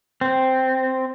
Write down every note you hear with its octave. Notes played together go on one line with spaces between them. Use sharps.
C4